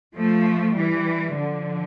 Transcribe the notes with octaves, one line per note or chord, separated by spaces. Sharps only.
F3 A3
E3 G3
D3 F3